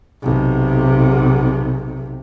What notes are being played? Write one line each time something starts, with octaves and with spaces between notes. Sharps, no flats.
B1 C3